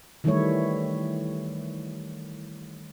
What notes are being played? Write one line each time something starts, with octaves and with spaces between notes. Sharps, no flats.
D#3 E3 G3 A3 E4 C#5